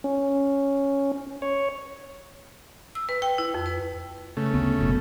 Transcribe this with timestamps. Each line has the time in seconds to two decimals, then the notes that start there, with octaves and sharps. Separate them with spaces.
0.04 C#4
1.42 C#5
2.95 E6
3.09 B4
3.22 G5
3.38 E4
3.54 F2
3.66 B4
4.37 C#3 A3
4.54 D2 B3
4.81 F#1 B2